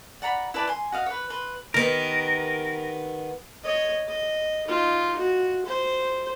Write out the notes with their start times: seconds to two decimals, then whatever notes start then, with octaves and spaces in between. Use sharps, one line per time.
0.22 D5 F#5 A#5 B5
0.54 E4 B4 D5 A5
0.67 G#5 C6
0.92 F#4 D#5 F5
1.06 B4 C#5
1.30 B4 C6
1.74 D#3 B3 G4 A#4
3.64 C#5 D#5
4.08 D#5
4.67 D#4 F4
5.18 F#4
5.66 C5